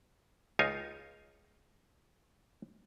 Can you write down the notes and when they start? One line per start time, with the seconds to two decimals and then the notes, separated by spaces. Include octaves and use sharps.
0.59 C#2 D#4 F4 C#5 G#5